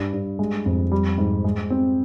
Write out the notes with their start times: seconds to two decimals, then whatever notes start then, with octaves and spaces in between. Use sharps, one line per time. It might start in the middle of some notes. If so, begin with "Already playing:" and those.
Already playing: G2
0.13 G2
0.39 G#3
0.66 F2
0.92 G3
1.18 G#2
1.44 G#3
1.70 C4